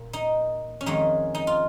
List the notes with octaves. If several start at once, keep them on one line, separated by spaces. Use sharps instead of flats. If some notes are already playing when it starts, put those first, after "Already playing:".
Already playing: A#2 A#3
D#4
C#4
F2 D#3 G#3 D#4
D#4
F4